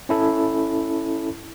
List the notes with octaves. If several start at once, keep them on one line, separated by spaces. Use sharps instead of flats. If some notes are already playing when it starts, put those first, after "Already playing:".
C#4 E4 A4